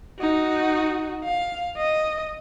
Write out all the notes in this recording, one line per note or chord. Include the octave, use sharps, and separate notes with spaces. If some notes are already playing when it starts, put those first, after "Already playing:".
D#4 F#4
F5
D#5